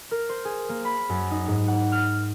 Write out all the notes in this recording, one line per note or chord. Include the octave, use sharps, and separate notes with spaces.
A#4
C5
G#4
A#3
B5
F#2
D#4
G#2
F#5
F6